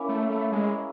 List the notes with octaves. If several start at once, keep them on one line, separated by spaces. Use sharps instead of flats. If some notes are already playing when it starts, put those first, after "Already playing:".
Already playing: A#3 C#4 E4
A3
A3
G#3